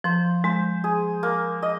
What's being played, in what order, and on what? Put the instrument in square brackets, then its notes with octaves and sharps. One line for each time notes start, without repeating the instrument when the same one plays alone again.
[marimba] F3 [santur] C5
[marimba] G#3 [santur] C5
[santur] G#4
A#3
D#5